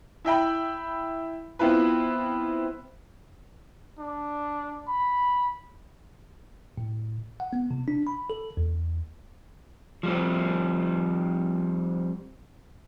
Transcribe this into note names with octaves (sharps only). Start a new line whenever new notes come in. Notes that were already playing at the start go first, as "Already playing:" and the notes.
E4 E5 G5 B5
B3 C4 E4 F4 B4
D4
B5
A2
F#5
B3
C3
D4
B5
A4
E2
F3 G3 C4